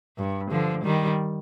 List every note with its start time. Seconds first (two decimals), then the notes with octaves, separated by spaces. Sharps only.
0.17 G2
0.51 D3 F3
0.84 D#3 G3